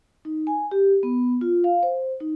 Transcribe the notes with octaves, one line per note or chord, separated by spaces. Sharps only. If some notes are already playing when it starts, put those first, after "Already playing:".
D#4
G#5
G4
B3
F4
F5
C5
D#4